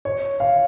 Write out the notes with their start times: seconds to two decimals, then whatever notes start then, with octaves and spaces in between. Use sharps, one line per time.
0.05 C#5
0.40 F5